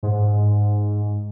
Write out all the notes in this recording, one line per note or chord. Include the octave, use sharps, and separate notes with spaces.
G#2